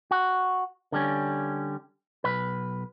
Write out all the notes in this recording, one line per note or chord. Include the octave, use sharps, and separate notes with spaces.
F#4
D3 G3 C#4
B1 B4